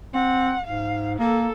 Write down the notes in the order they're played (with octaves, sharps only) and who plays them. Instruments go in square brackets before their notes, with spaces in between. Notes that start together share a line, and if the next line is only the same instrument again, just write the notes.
[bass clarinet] C4 [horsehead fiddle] F#5
[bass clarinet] G#2 [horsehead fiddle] F5
[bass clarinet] A#3 [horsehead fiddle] A4